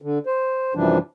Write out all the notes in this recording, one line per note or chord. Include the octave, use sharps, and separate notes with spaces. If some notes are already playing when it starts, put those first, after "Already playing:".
D3
C5
F#2 C3 E3 F3 G3 D4